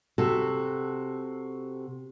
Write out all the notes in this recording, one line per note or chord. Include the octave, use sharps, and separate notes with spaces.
C3 F#4 A4